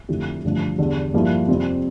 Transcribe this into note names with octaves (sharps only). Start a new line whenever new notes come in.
F2 D3 A3 E4 G4
A1 G2 D3 F3
E2 D3 G3
G2 F3 A#3 E4
F2 C3 G3 C4